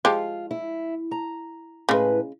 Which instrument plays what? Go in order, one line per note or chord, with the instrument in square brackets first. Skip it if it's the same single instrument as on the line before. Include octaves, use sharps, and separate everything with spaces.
[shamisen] F3 G#3 G4 [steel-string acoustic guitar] F4
[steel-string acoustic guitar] E4
A#5
[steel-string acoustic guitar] A2 B4 [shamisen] C#3 G#3